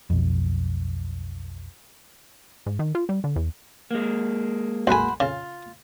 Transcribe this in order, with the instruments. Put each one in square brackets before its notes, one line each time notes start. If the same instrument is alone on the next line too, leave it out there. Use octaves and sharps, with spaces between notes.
[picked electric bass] B1 F2
[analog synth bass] G#2
D#3
F4
G3
D3
E2
[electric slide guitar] G#3 A#3
[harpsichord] B1 G#5 [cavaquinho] C5 F#5 B5
[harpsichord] C#3 [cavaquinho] F4